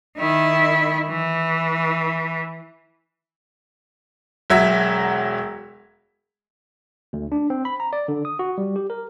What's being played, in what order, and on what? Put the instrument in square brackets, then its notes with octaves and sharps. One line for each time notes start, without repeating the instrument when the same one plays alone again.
[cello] D#3 E4
E3
[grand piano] E1 F#3 E5 G#6 B6
[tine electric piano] D2
D4
C4
B5
A#5
D5
D3
D#6
F#4
G3
G4
A#4